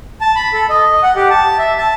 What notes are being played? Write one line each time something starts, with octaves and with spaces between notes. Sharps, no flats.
A5
B5
A4
D#5
F#5
G4
A5
E5
A5